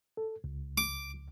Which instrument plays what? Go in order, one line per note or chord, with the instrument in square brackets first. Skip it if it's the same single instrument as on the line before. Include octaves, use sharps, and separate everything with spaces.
[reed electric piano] A4
C#2
[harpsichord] D6